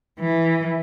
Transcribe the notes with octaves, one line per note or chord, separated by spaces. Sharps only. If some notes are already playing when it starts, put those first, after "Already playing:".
E3